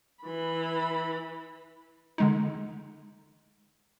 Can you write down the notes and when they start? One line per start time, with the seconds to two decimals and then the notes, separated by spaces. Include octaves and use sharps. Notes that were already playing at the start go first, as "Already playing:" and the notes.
0.23 E3 B5
2.18 D3 G#3 D#4